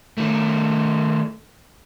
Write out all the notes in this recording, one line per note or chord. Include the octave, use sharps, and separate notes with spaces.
D#3 A3